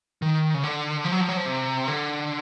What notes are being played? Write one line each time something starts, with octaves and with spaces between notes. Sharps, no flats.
D#3
C#3
D3
F3
F#3
F3
F#3
F3
C3
D3